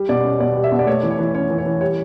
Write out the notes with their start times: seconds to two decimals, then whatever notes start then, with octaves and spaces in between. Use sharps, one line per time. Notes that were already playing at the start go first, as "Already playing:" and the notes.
Already playing: G3
0.09 B2 D5
0.24 C#4
0.40 B2 D5
0.56 G3
0.64 E5
0.72 B2
0.79 D5
0.87 A3 C#5
1.03 E3
1.11 C#5
1.19 E3
1.34 C#4 C#5
1.50 E3
1.58 C#5
1.66 E3
1.81 G3 C#5